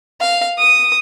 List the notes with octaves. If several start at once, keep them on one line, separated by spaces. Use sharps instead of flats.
F5
D#6